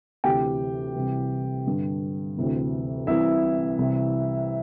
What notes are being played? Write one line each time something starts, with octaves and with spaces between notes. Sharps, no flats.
D2 C3 E3 G4 G5
C2 C3 E3
G2 D3
D2 C3 E3
C2 C3 E3 E4 E5
C2 C3 E3